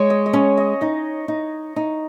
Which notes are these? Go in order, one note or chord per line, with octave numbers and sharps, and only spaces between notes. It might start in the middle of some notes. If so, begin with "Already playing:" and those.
Already playing: G#3 C#5
D#5
D#5
C#4 C#5
D#5
D#4 D#5
D#4
D#4